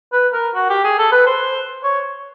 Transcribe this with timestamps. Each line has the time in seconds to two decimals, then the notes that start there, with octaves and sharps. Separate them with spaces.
0.12 B4
0.33 A#4
0.54 F#4
0.69 G4
0.84 G#4
0.98 A4
1.12 B4
1.26 C5
1.83 C#5